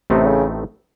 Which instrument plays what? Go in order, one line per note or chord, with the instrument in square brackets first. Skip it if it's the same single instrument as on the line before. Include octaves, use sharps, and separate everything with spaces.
[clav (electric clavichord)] A1 A2 A3 C4 D#4 [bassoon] C3
[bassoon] C#3